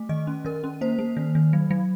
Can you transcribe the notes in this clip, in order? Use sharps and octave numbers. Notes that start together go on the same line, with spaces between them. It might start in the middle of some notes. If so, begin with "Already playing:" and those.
Already playing: A3
D#3 D#5
C#4
D#3 A#4
C#4
A#3 C5
A#3
D#3
D#3
F#3
F#3